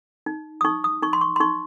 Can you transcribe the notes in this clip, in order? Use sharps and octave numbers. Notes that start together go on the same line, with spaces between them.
D#4
D#6
D#4 C#6
D#6
D#4 C#6
C6
C#6
C6
D#4 C#6